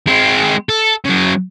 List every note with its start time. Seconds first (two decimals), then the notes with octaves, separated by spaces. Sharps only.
0.08 G#3 C4
0.69 A4
1.05 C#3 F#3